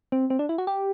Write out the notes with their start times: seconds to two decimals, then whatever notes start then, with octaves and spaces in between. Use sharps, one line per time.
0.12 C4
0.30 C4
0.39 D4
0.49 E4
0.58 F#4
0.67 G4